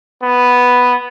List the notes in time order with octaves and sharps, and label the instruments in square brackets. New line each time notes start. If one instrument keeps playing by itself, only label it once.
[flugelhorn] B3